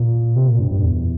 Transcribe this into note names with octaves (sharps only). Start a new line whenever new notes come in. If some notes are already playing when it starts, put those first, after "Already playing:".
Already playing: A#2
C3
A#2
G2
G2
E2